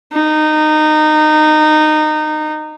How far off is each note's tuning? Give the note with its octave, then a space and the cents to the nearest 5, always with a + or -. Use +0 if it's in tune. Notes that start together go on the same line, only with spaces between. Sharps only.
D#4 -20